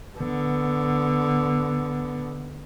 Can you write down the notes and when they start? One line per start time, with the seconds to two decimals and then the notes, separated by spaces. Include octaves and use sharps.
0.18 D3 B3